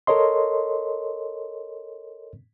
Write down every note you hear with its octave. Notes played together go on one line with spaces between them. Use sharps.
A4 A#4 C#5 D#5 C6